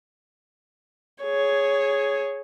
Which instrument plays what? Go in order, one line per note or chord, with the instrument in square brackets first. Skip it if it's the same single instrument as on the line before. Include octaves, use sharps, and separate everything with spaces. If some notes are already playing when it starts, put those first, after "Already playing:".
[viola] G#4 C#5